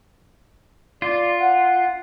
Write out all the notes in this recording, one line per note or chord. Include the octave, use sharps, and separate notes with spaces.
F4 D5
F#5